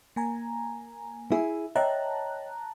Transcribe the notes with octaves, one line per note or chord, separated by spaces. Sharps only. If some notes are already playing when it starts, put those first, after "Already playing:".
A#3 G#5 A#5
E4 G#4 E5
C#5 D#5 E5 G5 A5 A#5 F#6